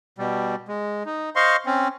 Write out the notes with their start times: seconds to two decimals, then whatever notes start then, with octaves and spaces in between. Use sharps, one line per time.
0.19 B2 G3
0.68 G#3
1.06 D#4
1.36 C5 D#5 F5 C6 C#6
1.66 C4 C#4